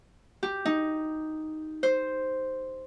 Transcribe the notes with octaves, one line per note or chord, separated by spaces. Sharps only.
G4
D#4
C5